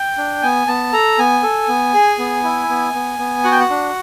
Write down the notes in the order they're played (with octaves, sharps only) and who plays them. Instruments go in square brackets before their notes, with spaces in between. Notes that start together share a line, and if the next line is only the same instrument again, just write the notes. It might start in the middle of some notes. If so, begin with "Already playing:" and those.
Already playing: [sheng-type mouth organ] G5
D4
B3 G#5
B3 A5
A4 A#5
B3 G#5
A4
B3
G#4
B3
E4
B3
B3
B3
F#4 F#5
G5
F#5
D4